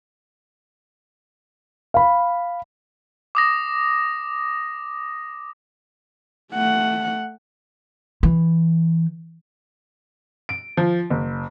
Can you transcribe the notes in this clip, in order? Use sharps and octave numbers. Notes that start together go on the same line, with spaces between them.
F5 B5
D6 D#6 A#6
A3 F#5
E3
D7
F3
F#1